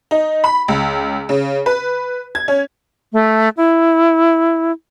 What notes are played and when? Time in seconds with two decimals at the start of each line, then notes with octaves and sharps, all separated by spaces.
0.11 D#4
0.44 B5
0.68 C#2
1.29 C#3
1.66 B4
2.35 G#6
2.48 C#4
3.13 A3
3.57 E4